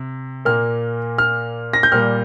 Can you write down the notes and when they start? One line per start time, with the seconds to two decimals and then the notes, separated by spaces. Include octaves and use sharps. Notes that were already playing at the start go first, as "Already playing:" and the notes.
Already playing: C3
0.45 A#2 A#3 F6
1.18 F6
1.74 A#6
1.83 G6
1.92 A#2 G3 A#3 F6